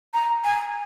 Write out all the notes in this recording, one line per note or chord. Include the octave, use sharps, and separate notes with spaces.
A#5
G#5